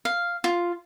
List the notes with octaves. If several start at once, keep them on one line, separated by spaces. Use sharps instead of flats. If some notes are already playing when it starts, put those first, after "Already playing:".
F5
F4